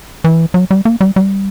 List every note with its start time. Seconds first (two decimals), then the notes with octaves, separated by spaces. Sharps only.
0.24 E3
0.54 F#3
0.71 G3
0.85 A#3
1.01 G3
1.16 G3